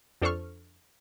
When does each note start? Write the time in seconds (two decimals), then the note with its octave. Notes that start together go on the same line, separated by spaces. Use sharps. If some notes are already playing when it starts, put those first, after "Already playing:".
0.22 F2 D4 A4 C5 C#6 F6